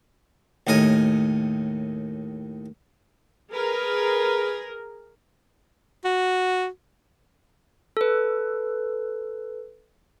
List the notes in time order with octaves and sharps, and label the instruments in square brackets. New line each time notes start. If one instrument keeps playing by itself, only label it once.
[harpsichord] D#2 A2 A#4 D#5 G#5
[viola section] G#4 A#4 [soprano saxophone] B4
[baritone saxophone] F#4
[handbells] A4 B4